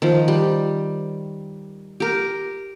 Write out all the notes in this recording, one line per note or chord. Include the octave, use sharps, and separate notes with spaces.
D#3 F3
G3
G4 A#4